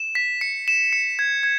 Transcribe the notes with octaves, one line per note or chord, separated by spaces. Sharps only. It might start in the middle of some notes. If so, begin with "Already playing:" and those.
Already playing: E7
B6
C#7
E7
C#7
G#6
G#6